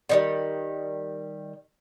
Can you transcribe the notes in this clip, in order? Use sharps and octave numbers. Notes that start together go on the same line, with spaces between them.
D3 D#3 G3